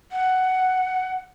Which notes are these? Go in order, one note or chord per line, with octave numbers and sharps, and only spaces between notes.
F#5